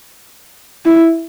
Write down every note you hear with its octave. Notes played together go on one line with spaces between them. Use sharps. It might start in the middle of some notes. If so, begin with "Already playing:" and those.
E4